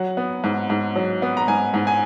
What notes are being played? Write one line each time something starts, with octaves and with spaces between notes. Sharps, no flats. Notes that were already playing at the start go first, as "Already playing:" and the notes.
Already playing: F#3 F#5
B3
G#2
G#2
F#3
B3
A#5
G#2 G#5
G#2
G#5